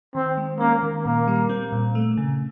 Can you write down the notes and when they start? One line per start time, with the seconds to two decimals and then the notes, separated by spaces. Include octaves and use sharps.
0.15 D#3 C4
0.37 G#3
0.60 A#3 C#4
0.83 D#3
1.05 A#2 A#3
1.28 G3
1.49 C4
1.72 A#2
1.95 A3
2.17 C#3